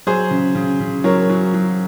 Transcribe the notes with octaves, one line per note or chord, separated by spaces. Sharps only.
F#3 G#4 C5
C#3
C#3
C#3
F#3 A#4 C#5
F#3
F#3